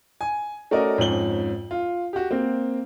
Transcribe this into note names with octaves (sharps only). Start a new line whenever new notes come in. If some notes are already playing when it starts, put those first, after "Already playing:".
G#5
A3 C#4 F#4 A#4 D5 D#5
F2 G#2 C#4 F#7 G7
F4
F#4 G4
A#3 C4